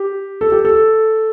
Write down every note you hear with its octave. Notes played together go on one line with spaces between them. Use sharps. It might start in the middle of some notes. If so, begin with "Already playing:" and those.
Already playing: G4
A4
G4
A4